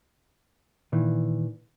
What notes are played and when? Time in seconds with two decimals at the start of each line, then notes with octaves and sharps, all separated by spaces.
0.92 A#2 D#3 E3